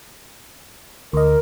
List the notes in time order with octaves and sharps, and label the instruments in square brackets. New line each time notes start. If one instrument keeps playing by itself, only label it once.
[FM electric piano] D2 D#5 [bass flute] A#4